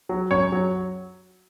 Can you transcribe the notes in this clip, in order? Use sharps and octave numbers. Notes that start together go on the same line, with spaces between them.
F#3
F#2 C#5
F#3